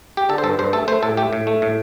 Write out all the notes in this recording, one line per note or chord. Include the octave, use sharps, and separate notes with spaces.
G4
D3 A4
C5
G2 A4
G2 C5
A3 A4
A3 C5
A2 A4
A3 G4
A2
A3
A2